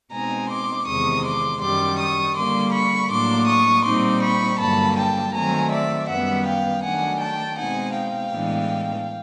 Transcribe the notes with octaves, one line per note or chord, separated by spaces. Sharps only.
B2 G#3 C4 D#4 G#5 A#5
C6 D6
E2 C3 D#3 G#3 C#6 D#6
C6 D6
F#2 D#3 G3 C6 D6
C#6 D#6
D3 G3 A#3 C6 D6
B5 C#6
A2 F#3 A#3 D4 C6 D6
C#6 D#6
A#2 G3 C4 D#4 C6 D6
B5 C#6
G2 D3 F#3 A#3 A5 B5
G5 A5
D#3 F#3 A3 C4 G#5 A#5
D5 E5
F#2 D#3 G3 B3 E5 F#5
F5 G5
D#3 F#3 A3 D4 F#5 G#5
G5 A5
B2 G#3 C4 D#4 F#5 G#5
F5 G5
A2 E3 G#3 B3 D4